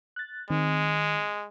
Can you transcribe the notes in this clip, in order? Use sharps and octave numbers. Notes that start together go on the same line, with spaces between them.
F#6 A6
D#3 G#3 C4